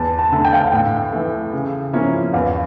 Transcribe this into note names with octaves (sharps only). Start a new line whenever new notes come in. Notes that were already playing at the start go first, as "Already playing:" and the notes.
Already playing: E2 A5
A5
D3 A3
G5
F5
G5
A2
E3 A3
C#3
F3 A#3 C#4 E4
E2 F5